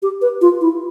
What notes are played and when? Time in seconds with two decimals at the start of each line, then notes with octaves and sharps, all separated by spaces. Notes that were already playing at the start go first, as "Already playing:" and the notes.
0.03 G4
0.22 B4
0.41 F4
0.61 E4